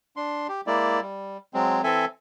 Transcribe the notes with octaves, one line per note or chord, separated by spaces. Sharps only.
D4 C6
G4
G#3 A#3 E4 D5
G3
F#3 G#3 C4
E3 C4 A4 E5 G#5